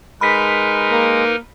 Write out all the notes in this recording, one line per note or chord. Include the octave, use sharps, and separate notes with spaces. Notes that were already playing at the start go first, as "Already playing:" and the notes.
G#3 D#4 A#4 B4 B5 B6
A#3